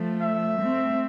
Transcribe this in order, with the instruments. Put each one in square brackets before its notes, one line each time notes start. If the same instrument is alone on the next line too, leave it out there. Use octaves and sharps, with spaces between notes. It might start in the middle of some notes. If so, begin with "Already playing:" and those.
Already playing: [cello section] F3 A3
[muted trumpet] E5
[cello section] A3 C4